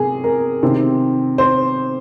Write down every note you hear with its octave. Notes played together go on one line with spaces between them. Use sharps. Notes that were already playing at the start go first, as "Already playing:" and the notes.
Already playing: C3 G#4 A#4
A#4
C3 D#3 C4
C5